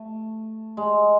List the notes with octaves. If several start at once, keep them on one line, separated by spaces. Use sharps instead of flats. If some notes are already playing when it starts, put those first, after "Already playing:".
Already playing: A3
G#3